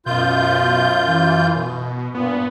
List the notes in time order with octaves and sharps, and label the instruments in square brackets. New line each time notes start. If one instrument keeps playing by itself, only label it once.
[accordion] F#2 F4 G6 [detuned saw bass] B2
[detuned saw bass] E3
B2
[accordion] G2 A#2 [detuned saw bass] B3